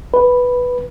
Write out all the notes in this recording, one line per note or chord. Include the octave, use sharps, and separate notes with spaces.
B4